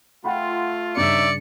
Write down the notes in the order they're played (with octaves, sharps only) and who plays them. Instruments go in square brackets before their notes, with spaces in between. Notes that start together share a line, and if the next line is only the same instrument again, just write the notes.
[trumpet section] A3 F4 [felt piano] F#5 G5 B5
[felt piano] G2 C#3 [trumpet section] C#4 D#4 E5 [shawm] D5 [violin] C#7